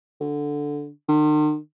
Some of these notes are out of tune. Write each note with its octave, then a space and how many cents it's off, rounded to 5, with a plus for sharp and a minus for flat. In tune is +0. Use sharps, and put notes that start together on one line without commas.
D3 -5
D#3 -45